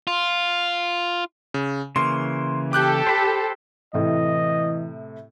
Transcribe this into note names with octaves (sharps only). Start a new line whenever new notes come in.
F4
C#3
C#3 E3 A#3 C6
G4 A4 D6 F#6 G6
C5 B5
A2 C3 E3 D#5